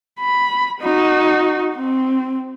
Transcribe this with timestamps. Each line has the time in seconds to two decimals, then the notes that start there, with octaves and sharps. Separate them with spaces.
0.20 B5
0.81 D#4 F#4
1.76 C4